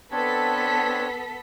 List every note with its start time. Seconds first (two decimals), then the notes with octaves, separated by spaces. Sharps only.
0.12 B3 C4 D4 A4 C#5 B6